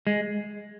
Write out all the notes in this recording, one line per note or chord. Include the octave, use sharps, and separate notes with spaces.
G#3